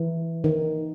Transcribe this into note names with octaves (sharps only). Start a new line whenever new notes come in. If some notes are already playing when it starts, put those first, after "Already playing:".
Already playing: E3
D#3